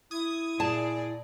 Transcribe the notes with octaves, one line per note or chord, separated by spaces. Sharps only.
E4 D#6 G#6
A#2 G#4 D5 A5